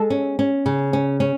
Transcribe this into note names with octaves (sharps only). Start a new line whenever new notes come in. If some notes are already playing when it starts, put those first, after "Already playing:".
Already playing: G#3 A4
C#4
C#4
C#3
C#4
C#4